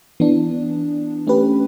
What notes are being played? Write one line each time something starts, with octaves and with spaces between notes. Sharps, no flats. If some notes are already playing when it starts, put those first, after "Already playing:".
E3 B3 D4
A3 C#4 G4 B4